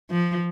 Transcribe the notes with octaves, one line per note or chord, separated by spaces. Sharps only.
F3